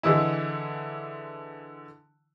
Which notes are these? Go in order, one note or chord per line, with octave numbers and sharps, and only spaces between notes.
D3 E3 G#3 E4